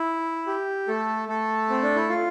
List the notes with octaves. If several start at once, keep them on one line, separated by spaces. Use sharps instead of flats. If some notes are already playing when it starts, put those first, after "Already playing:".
Already playing: E4
G4
A3 A4
A3 A4
C4
D4
E4
F4